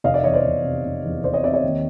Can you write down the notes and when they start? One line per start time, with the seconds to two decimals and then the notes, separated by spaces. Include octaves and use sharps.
0.04 F1 D#5 F5
0.14 D5 E5
0.24 E2 C#5 D#5
0.34 C5 D5
0.44 F1
0.64 C3
0.84 F1
1.04 E2
1.23 F1 C5 D5
1.33 C#5 D#5
1.43 C3 D5 E5
1.54 C#5 D#5
1.63 D#2